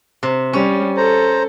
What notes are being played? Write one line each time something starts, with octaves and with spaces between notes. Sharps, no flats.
C3
G3 C#4
A4 C5 A#5